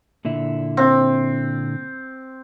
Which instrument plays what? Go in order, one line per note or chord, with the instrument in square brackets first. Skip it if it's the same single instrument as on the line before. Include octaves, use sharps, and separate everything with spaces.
[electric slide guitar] A#2 D3 E4
[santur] C4